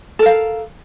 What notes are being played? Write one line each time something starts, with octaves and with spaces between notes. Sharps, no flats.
A4 A#4 F5